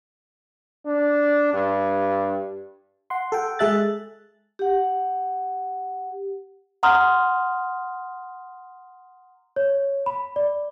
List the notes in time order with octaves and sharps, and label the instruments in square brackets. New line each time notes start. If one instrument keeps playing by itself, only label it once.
[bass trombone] D4
G2
[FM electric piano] F#5 C6
A4 F#5 G5
G#3 G#4 A4 E5 F#6 A6
[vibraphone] G4 F#5
[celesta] F#5 A#5 C6 D#6 F6
C#5
B5
D5